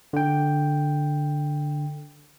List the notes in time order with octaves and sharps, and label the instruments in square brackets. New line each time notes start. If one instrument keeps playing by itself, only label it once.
[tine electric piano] D3 G5